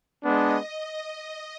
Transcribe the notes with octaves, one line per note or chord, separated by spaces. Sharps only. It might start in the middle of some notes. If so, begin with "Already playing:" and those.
G#3 B3 D4 D#5